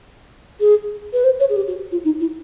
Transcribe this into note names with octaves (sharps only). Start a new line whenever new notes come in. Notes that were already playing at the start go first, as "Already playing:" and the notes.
G#4
B4
C5
C#5
G#4
G4
F#4
F4
D#4
E4